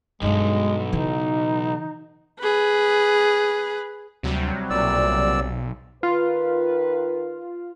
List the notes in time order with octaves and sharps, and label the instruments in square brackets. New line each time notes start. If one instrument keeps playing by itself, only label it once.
[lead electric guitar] B1 [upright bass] G2 D4 [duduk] G#3
[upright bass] C#3 E3 [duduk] D#4
[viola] G#4 B4
[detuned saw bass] D2 [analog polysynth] C3 F#3 G3
[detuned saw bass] B1 [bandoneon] A#2 D5 E6
[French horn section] D#3 B4 [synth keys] F4